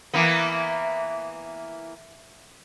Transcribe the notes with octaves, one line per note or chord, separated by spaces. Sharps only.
E3 A#3 B3